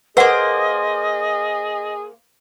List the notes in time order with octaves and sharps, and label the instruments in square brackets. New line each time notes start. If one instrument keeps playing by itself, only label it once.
[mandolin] A#3 C5 [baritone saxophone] G#4 [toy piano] B4 F#5 [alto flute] D#5